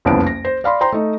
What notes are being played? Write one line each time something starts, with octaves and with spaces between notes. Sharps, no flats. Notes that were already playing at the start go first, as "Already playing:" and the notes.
F#1 C2 F2 B3 C#4 D7
A#6
C5
D5 F5 B5 C6
C5 G5 A#5 C6
A3 D#4